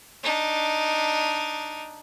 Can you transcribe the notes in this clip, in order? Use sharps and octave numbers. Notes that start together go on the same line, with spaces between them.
D4 D#4